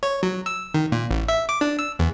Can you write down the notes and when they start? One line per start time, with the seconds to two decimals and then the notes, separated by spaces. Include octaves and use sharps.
0.03 C#5
0.23 F#3
0.46 E6
0.74 D#3
0.92 A#2
1.11 A1
1.28 E5
1.49 D6
1.61 D4
1.79 E6
1.99 E2